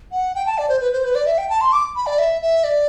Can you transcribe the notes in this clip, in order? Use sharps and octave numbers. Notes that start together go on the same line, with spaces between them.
F#5
G5
A5
D5
C5
B4
C5
B4
D5
E5
G5
A5
C6
D6
B5
D5
E5
E5
D5